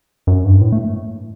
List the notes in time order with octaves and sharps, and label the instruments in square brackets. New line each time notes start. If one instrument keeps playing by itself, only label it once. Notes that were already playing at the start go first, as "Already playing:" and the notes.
[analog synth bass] F#2
G2
A2
A3